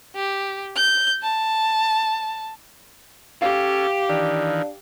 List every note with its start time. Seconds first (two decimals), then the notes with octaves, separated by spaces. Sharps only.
0.15 G4
0.76 G6
1.23 A5
3.42 C#4 G4 A4 F5
4.09 D#3 E3 D4